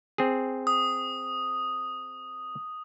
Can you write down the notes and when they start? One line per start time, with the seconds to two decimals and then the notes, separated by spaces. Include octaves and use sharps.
0.18 C4 G#4
0.67 D#6